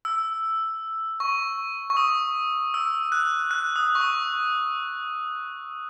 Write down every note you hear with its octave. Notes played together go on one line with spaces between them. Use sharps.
E6
C#6
C#6
D#6
E6
F#6
F#6
D#6
C#6
D#6